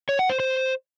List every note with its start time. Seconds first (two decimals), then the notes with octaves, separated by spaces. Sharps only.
0.09 C#5
0.19 F#5
0.29 C5
0.40 C5